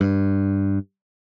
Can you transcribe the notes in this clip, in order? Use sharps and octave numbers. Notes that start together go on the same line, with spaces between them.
G2